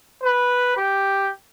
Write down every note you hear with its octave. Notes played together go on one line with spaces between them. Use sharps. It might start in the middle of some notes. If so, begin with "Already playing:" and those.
B4
G4